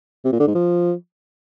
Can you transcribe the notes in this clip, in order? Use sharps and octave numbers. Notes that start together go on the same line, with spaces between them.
C3
A#2
D3
G#2
F3